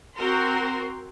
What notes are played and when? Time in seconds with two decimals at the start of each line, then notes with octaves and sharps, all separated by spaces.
0.17 C4 F#4 A#4 C6